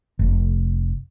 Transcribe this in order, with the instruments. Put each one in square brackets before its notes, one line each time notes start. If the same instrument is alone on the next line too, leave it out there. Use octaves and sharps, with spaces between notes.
[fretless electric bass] F1